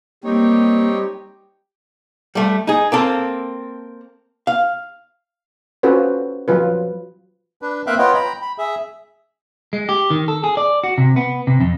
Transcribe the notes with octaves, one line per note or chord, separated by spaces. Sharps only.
G3 A#3 C4 D#4 G4 C#5
G3 A3
D#4 G#4
A#3 C4 A4
F5
C#4 F4 F#4 A4 B4 C5
F3 F#3 F4 B4
D4 B4
A#3 C4 E5 F5 G5 F#6
B3 F4 B4 C#5 D#5 G5
G5 A#5 B5
B5
G#4 E5
G#3
G4
D#3
A4
G#4
D5
F#4
C3
B3
C3
F2